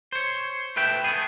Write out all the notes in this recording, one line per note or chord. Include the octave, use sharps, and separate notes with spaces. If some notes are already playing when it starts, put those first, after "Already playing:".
C5 C#5
B2 A3 B4 E5 G5
A3 B3 G#4